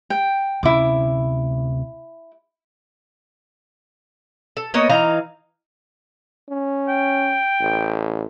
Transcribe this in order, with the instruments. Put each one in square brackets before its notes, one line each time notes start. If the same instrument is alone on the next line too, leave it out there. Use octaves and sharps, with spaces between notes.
[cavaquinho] G5
[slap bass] D2 C3 C#4 [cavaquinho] E4 D6
[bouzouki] A4
A#3 B3 C#5 D#5
E3 D#4 F5 A#5
[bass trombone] C#4
[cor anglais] G5
[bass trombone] A1